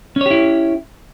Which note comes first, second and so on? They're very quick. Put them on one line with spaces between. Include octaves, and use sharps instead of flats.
C#4 C#5 G4 E4